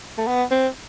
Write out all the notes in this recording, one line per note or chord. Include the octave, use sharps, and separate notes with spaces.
A3
B3
C4